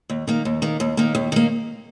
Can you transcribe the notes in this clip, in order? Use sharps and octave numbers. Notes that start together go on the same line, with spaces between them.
D#2
D#3 A#3
D#2
D#3 A#3
D#2
D#3 A#3
D#2
D#3 A#3